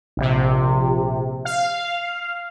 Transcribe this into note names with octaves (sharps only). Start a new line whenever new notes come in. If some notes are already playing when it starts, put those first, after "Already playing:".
A#1 C3
F5